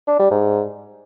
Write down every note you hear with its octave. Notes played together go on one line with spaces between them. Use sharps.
D4
G3
G#2